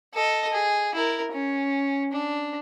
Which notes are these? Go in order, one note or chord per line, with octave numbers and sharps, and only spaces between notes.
A4 D#5
G#4
E4 A#4
C#4
D4